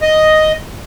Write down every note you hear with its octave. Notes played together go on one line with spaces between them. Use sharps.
D#5